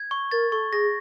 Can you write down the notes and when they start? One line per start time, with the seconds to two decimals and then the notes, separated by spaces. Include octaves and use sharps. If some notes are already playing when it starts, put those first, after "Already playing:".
Already playing: G#6
0.11 C#6
0.31 A#4 A6
0.52 A4 C#6
0.72 G#4 A#6